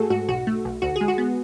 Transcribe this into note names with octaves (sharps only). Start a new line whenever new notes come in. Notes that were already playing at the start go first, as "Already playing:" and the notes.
Already playing: G#2 A3 F#4 G#4 A4
G#2 F#4
B1 F#4
A3
B1
D2 F#4
G#4
G#3
F#4
B3